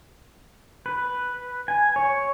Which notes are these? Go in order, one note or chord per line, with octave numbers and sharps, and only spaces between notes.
B4
G#5
C#5